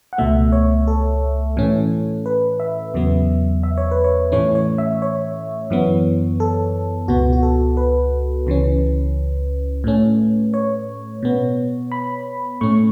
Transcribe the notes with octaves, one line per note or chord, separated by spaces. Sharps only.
F#5
C#2 B2 A3 E5
C#5
A4
A2 E3 C#4
B4
E5
E2 C#3 F#3 B3
E5
C#5
B4
C#5
A2 E3 A3 C#4 C#5
C#5
E5
C#5
F#2 E3 B3
A4
C#2 B2 B3 F#4
F#4
A4
B4
C#2 C#3 E3 C#4
A2 A3 C#4
C#5
B2 B3
B5
A2 A3 C#4 C#6